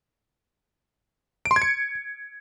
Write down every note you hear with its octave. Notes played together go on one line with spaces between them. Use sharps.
D7
C6
G#6
C#7